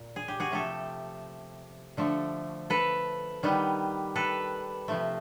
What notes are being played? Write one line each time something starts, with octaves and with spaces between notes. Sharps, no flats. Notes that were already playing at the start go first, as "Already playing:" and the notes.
Already playing: A#2
G#4
G4
F#4 G#4
C3 F3 A3 G4 A4
D3 F3 A3
A4 B4
D#3 G3 B3
A4 B4
C3 F3 A3